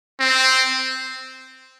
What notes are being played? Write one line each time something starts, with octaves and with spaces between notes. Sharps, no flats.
C4